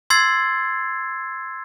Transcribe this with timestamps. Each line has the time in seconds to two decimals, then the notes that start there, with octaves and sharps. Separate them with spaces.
0.10 C6 E6 G#6 A6 C7